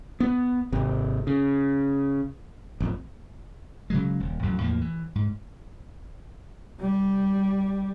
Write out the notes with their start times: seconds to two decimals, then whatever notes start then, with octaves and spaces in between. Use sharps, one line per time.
0.20 B3
0.72 G#1 C3
1.27 C#3
2.80 A1 F2
3.90 C#3 F#3 G#3
4.20 D#1
4.42 A1 F2 F#3
4.60 E2 A2 F3 A#3
4.81 E3
5.15 G#2
6.81 G3